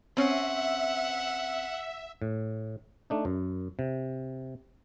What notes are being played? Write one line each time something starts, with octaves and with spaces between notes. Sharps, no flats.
C4 C#4 E5 F#5
A2
A3 D4 D#4
F#2
C3